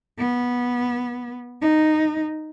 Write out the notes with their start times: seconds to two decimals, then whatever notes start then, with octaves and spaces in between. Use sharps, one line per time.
0.19 B3
1.61 D#4